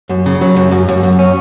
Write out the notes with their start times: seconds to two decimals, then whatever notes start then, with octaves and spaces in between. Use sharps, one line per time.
0.09 F#2
0.26 C#3
0.41 F#3
0.56 F#2
0.72 F#2
0.88 F#2
1.03 F#2
1.19 C#4